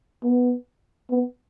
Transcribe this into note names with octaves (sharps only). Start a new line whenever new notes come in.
B3
B3